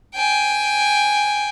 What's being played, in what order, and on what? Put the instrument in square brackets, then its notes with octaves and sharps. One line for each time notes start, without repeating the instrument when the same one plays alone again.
[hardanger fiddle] G5 G#5